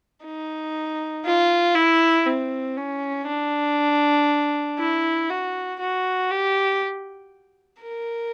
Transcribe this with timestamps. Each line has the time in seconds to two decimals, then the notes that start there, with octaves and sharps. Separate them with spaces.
0.25 D#4
1.26 F4
1.75 E4
2.27 C4
2.77 C#4
3.27 D4
4.79 E4
5.30 F#4
5.80 F#4
6.31 G4
7.82 A#4